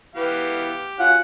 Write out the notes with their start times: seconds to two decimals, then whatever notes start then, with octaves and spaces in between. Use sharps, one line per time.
0.15 E3 B3 G4 F5
0.99 C#4 F4 F#4 F#5